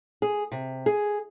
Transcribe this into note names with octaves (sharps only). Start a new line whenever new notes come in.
G#4
C3
G#4